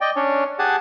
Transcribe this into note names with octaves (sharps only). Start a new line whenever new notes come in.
D5 D#5 G5
C#4 D4 C#5
G4 G#4 F#5 G#5 A5